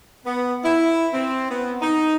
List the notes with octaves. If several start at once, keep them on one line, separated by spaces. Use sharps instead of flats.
B3
E4
C4
B3
D#4